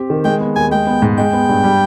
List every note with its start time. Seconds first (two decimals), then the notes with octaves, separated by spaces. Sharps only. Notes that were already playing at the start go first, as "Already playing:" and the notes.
Already playing: C4 G4
0.10 D#3
0.24 G#3 G5
0.40 B3
0.56 D#2 G#5
0.71 G#3 G5
0.87 B3
1.02 G#2
1.18 G#3 G5
1.33 B3
1.49 G2
1.64 G3